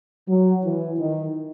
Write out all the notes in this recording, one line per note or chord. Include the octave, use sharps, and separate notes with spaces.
F#3
E3
D#3